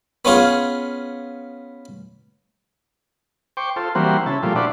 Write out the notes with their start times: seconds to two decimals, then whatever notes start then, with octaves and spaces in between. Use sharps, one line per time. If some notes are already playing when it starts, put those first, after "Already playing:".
0.25 B3 C#4 F4 G#4
3.57 C5 G5 C#6 D6
3.76 F4 A4 C5
3.95 E3 G3 A#3 C4 F#4 C5
4.26 C#3 E4 A5
4.43 A#2 F3 G3 A3 F4
4.56 D4 E4 F#4 B4 C5 D5